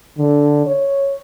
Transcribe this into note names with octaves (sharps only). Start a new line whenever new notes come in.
D3
C#5